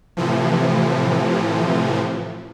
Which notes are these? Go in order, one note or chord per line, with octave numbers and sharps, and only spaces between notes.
A2 C3 E3 F3